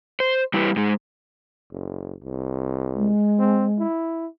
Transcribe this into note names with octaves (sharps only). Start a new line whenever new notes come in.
C5
G3 E4 G4 B4
G#2 G#3
F#1
C2
G#3
C4
E4